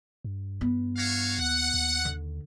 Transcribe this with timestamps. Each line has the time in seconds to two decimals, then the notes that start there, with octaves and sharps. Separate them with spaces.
0.24 G2
0.61 B3
0.96 F#4 C#5 F5
1.39 D#2 F#5
1.74 D#2
2.05 D3